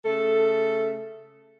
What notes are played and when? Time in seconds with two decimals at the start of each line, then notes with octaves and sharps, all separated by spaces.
0.05 C#3 A3 A4